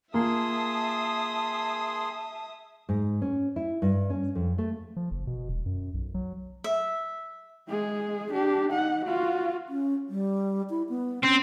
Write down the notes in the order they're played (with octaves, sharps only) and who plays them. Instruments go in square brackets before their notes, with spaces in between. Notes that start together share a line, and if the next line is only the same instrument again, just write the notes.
[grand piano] A#3 F4 [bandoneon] G#4 C6 [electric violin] E5 D#6 [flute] A5
[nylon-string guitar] G#2
C#4
E4
G2
C#4
F2
A3
[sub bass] F3
F#1
B2
E1
F#2
B1
F#3
[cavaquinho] E5
[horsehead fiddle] G#3 G#4
D4 G4
D#4 F#5
F4 F#4
[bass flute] C#4
G3
E4
B3
[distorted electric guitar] C4 [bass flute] C#4